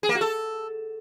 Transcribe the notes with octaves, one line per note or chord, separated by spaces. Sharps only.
G#4
A#3
F#4
A4